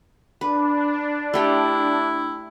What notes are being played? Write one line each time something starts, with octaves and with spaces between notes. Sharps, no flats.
D4 B4
A3 E4 G4 G5